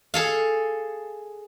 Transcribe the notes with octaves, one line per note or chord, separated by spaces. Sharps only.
G#4 A4 F5